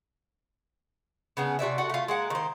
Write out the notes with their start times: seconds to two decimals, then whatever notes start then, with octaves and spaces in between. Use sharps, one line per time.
1.37 C#3 B3 D4
1.59 C3 F#4 D5 E5
1.78 F#4 A4 F#5
1.90 A3 F4
2.08 G#3 A#3 F#5
2.30 D#3 C5